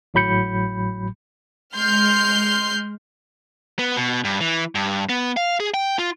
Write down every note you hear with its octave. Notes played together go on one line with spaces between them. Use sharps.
G#1 A2 F#3 B5 G6 C#7
G#3 C6 F6 G6
B3
B2
G2
E3
G2
B3
F5
G#4
G5
F4